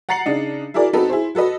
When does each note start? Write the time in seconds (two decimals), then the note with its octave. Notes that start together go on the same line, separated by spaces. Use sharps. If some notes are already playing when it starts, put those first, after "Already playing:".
0.09 F#5 A#5 A6 C7 C#7 F#7
0.26 C#3 D4 D#4
0.74 E4 F#4 G#4 A#4 D5
0.93 C4 D#4 F#4 A4 B4
1.09 E4 G#4 C5
1.35 F#4 A4 B4 D#5